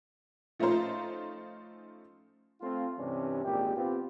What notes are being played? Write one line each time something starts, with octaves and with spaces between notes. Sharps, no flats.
F3 A3 C#4 D#4 F4 C5
A3 C4 F4
G2 C3 E3 C#4 D4
G#1 A#2 G4
B3 C4 F4 G4